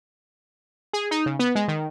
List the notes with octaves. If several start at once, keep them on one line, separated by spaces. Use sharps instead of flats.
G#4
D#4
C#3
B3
G#3
D#3